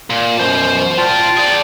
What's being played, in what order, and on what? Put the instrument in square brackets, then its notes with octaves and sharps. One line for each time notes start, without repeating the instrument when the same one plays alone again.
[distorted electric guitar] A#2
[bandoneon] F#2 B2 [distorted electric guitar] C5 A5
[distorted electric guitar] F4 D5 [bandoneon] G5 A5
[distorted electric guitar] G#4 D5